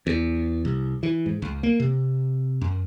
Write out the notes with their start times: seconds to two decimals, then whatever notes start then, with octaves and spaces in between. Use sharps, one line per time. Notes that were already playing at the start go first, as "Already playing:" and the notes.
0.07 E2
0.65 C2
1.03 E3
1.26 G#2
1.42 C#2
1.63 A#3
1.80 C3
2.61 F#2